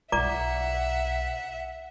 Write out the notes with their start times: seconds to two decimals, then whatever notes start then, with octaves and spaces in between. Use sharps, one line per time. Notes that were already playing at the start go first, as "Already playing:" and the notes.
0.12 B1 D5 E5 F#5 A#5 D6